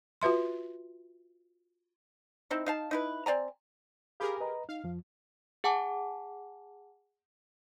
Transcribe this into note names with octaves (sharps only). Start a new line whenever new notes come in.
F4 F#4 B4 E5 C6
C4 D#4 E4
D#4 F5 A5
D#4 E4 B4
C4 D5 G#5 A#5
G4 G#4 A#4 F5 B5 D6
B4 D#5 A#5
D#4 F5
F2 F3
G#4 F#5 G#5 A5 D6